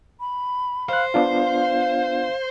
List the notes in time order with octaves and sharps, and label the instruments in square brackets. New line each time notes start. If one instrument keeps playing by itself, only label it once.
[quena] B5
[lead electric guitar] C5 [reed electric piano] F5 F#6
[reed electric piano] B3 D4 F4 [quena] F5